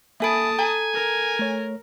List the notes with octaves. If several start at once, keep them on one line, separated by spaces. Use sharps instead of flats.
A#3 A4 E5 G#5 A5 B5 D#6 D7
A4 G#5 A#5
A#4
A3 C#5